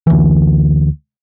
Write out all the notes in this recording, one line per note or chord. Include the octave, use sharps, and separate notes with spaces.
D2 E3